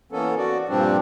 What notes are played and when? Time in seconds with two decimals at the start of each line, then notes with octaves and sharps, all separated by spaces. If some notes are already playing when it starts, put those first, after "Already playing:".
0.12 E3 A#3 B3 C#4 A4
0.38 F#4 D5
0.69 G2 A#2 F3 G3 C4 D4